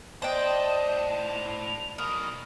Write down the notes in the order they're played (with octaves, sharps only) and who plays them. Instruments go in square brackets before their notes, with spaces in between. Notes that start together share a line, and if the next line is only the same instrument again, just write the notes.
[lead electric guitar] A2 A5 [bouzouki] D4 [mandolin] C5 G5 [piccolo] D#5
[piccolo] F7
[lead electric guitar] B1 B2 [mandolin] A#4 [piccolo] D#6